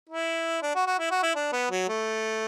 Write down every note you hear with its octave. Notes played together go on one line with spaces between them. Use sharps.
E4
D4
F#4
F#4
E4
F#4
E4
D4
B3
F#3
A3